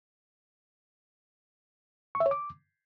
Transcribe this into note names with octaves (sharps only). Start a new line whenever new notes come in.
C#6
E5
C#5
D6